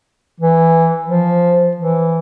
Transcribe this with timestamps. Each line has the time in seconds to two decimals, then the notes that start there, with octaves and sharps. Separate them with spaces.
0.40 E3
1.07 F3
1.76 E3